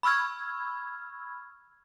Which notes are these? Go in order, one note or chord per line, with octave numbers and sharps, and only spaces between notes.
B5 C#6 E6 F6 G#6